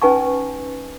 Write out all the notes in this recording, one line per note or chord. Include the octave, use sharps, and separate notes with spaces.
C#4 D#4 B4 G#5 A5 C#6